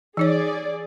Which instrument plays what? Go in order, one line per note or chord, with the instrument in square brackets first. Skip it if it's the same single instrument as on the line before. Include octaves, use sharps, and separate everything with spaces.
[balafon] E3 D#4 C#5 [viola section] G#4 D5